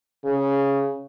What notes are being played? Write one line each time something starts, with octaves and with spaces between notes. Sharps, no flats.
C#3